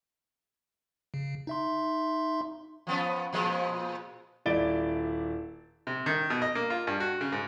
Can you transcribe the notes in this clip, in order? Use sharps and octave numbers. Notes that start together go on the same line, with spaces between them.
C#3
D#4 E5 C6
F3 B3 C#4
A#2 F3 G#3
D#1 E4 D5 A6 D7 G7
C3
D#3
B2
D#5
A#3
F4
G2
F#4
C#3
G#2